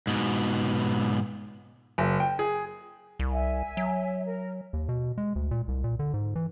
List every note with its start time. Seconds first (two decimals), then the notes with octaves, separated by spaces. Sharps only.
0.07 G#2 B2
1.98 F#1
2.20 G5
2.39 G#4
3.20 C2
3.32 E5 G#5
3.77 F#3
4.25 A#4
4.73 D#2
4.89 B2
5.18 G#3
5.36 D2
5.51 A#2
5.68 C2
5.84 A#2
5.99 D3
6.14 G#2
6.36 E3